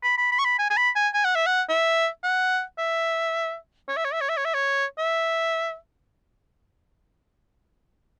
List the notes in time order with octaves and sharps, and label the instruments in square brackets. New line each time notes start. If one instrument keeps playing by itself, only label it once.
[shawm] B5
B5
B5
C#6
B5
G#5
G#5
B5
G#5
G#5
F#5
E5
F#5
E5
F#5
E5
C#5
E5
C#5
E5
C#5
E5
C#5
E5
C#5
E5